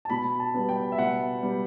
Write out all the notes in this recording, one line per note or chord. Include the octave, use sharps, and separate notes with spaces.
A5
B2 B5
A5
G3 B3
G5
E5
B2 F#5
G3 B3